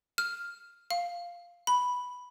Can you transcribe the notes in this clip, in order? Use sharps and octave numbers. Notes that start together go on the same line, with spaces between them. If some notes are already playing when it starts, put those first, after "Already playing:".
F6
F5
B5